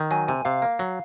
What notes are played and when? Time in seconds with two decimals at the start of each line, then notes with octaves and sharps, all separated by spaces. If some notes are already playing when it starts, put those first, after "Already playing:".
Already playing: D#3
0.11 F#3 G#5
0.28 C3 G#5
0.45 C3 F5
0.62 A#3
0.79 F#3